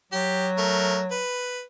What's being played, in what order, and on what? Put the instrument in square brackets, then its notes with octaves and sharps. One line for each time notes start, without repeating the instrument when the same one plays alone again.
[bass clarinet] F#3 [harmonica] G4
[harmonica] A3 A#4
B4